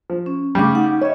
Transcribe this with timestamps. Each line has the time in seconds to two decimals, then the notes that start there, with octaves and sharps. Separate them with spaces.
0.10 F3
0.26 C#4
0.55 C#3 G3 A3 D6
0.71 D#4 F#5
1.02 C#5 D#5 E5